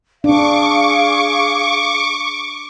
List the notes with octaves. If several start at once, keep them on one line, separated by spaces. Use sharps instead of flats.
D4 G#4 F5 C#6 D6